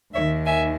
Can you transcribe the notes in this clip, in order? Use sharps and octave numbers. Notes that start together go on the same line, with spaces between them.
D#2 C#5 E5
D#3
E5 G#5